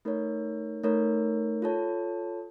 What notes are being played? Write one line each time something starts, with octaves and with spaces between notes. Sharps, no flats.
A3 D#4 A#4 C#5
A3 D#4 A#4 C#5
F4 A4 C#5 A5